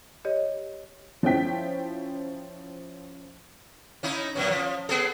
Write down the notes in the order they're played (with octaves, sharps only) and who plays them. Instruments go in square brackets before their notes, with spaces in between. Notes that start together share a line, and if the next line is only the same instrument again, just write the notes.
[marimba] G4 C#5 D#5
[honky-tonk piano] F3 C#4 E4 G5 B6
[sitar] C#4 D#4 E4
F#2 B2 C#4
F3
B3 G#4 A4